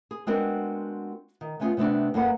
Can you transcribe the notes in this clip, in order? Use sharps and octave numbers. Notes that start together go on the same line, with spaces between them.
G#4
G#3 B3 C4 D4 F#4 A#4
D#3
A3 B3 C#4 F4 G#4
C3 A3 B3 C4 D4
F#2 F#3 A#3 A4 B4 F#5